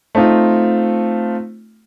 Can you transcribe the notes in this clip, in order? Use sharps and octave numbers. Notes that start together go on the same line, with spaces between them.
A3 C4 D#4 F4